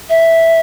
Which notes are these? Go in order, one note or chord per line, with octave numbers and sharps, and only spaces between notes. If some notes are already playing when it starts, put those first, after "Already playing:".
E5